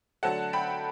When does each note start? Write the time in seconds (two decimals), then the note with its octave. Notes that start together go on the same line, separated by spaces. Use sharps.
0.23 D3 F#3 A3 F#5 A5
0.53 G5 B5